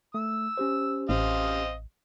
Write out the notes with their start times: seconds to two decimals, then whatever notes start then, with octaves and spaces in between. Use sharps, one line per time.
0.14 A3 E6
0.57 C#4 G4 C5
1.09 A1 C4 D#5 F5